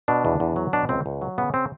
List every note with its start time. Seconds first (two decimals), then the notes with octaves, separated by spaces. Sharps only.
0.08 B2 D4
0.25 E2
0.40 E2
0.56 F#3
0.73 B2 D4
0.89 C#2 C4
1.06 C#2
1.21 F#3
1.38 C#3 B3
1.54 C4